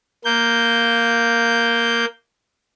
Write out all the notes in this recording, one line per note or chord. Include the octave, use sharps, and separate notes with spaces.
A#3 G6